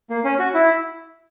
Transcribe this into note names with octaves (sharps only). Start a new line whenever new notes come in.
A#3
C#4
F#4
E4